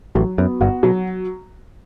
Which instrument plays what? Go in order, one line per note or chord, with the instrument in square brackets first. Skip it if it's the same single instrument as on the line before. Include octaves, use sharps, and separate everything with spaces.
[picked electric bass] A1 A2 [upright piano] F#3
[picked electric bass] F#2 [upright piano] B3
[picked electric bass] G1 G2 [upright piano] F#4
[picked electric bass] B2 [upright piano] F#3